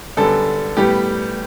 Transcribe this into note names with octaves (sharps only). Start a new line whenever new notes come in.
F#2 D3 G3 B3 A4
A2 G3 B3 G4